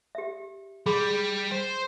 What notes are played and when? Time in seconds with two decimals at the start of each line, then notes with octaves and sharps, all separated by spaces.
0.15 G4 E5
0.86 G3 G#4 B5
1.51 C5